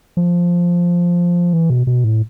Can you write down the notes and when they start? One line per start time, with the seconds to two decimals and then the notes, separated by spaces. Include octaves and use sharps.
0.17 F3
1.53 E3
1.70 B2
1.87 B2
2.04 A2